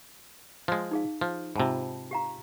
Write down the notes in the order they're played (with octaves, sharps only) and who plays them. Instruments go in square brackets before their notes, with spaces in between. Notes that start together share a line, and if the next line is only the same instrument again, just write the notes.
[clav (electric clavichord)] F3 G#3
[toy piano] D#4 G#4 F5
[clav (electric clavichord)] F3
[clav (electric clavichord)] G#2 C3 [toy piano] F4 A5 B5
[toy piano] G4 F5 A#5